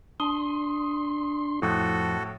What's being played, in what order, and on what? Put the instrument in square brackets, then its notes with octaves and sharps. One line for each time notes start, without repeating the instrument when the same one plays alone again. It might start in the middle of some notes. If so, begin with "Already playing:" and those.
[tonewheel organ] D4 C6 [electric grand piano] D#6
[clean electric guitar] F2 [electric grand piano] A2 [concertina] F#4 A4